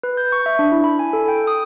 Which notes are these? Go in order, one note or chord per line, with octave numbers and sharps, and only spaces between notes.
B4
G6
C#6
E5
D4
E4
B5
G#5
A4
G5
D#6